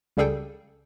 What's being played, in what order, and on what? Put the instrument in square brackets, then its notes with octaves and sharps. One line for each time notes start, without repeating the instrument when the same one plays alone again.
[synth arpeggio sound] C#2 C#3 G3 G#4 A4 G5